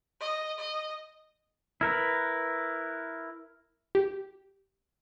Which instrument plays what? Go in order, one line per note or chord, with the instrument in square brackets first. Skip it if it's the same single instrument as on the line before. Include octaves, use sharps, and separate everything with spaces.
[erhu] D#5
D#5
[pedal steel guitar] E4 A#4 B4
[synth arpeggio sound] G4